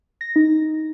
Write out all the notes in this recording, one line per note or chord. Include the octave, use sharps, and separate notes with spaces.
A#6
D#4